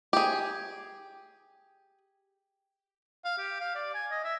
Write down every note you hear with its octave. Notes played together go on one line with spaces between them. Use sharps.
G4 G#4
F5
G4
F5
D5
G#5
D#5
E5